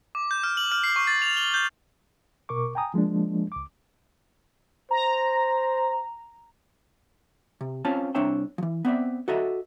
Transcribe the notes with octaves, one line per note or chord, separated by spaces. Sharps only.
D6
G6
F6
F#7
F6
C7
C#6
A6
F7
G7
G6
B2 A#4 C#6 D6
G5 G#5 A#5 D#6
F3 G#3 A#3 D4
C#2 D6
C5 A#5
C3
C4 C#4 F4 A5
C2 C4 D4 C#5 E5 G5
E3 F3
B3 C4 D5 E5
F#4 A4 D#5 E5